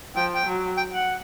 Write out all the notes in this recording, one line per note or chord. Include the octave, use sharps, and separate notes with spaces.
F3 G5
G5
F#3
G5
F#5